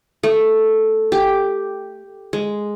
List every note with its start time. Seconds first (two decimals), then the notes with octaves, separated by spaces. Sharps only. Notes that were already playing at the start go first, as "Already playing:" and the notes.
0.23 A3
1.12 G4
2.33 G#3